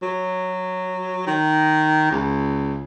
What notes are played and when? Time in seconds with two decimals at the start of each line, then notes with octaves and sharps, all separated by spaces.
0.02 F#3
1.27 D#3
2.11 C#2